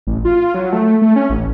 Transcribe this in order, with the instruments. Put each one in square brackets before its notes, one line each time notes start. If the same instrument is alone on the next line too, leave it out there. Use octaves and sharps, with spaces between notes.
[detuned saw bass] A1
F4
F#3
A3
A3
C#4
A1